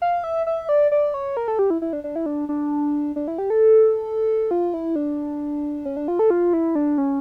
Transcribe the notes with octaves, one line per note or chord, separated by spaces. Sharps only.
F5
E5
E5
D5
D5
C#5
A#4
A4
G4
E4
E4
D4
D4
E4
D4
D4
D4
E4
G4
A4
F4
E4
D4
C#4
D4
F4
A4
F4
E4
D4
C#4